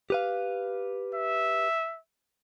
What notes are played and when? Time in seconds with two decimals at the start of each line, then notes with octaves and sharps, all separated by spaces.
0.10 G4 B4 F5
1.15 E5